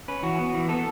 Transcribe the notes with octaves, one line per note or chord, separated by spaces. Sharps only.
C#4 B4
E3 F#4
B3
E3
B3 A4